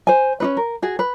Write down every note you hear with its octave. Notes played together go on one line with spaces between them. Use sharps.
C5 G#5
C#4 D#4 B4
A#4
F#4 G#4
B4